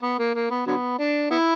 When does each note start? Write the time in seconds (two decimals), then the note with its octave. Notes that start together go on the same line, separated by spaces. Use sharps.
0.03 B3
0.19 A#3
0.35 A#3
0.51 B3
0.67 D3 F#3 B3
0.99 D4
1.31 B3 E4